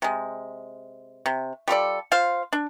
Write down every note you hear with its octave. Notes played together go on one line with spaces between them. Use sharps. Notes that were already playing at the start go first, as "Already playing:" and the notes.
C3 G#3
C3
G3 F4 A4 D5
F4 C5 F5
D4